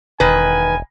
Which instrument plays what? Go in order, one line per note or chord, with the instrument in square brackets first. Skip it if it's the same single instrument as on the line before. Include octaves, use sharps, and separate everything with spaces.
[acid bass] E1 [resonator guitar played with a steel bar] D#3 B4 [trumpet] G#5